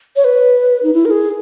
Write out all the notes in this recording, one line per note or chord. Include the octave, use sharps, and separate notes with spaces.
C#5
B4
D#4
E4
A#4
G#4